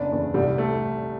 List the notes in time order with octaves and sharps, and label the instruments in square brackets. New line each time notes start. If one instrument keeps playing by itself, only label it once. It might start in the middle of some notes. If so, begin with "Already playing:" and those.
Already playing: [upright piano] F#1 B2 D4
E2
C2 G3
A3